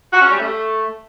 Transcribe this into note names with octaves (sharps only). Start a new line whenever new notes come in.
F#4
C#4
G3
A3